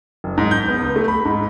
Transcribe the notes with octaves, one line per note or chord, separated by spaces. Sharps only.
F#1
G#2
G6
B3
C#2
A3
B5
G#2